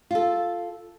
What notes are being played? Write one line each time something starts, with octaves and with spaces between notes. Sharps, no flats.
F4 A4